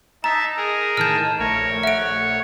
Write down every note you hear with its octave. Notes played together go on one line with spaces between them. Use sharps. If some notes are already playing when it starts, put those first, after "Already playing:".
D#4 E5 A5 A#5
G#4 A#4
A2 D#3 A5 F6 G6
A#1 A3 A#4 C#5
E5 F#5 D7